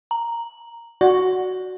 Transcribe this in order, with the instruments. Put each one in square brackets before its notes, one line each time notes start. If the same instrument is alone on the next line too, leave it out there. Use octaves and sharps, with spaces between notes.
[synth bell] A#5
[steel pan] F#4 [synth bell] D5